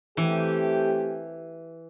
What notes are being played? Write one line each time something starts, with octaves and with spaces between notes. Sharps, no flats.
E3 A3 C4 G4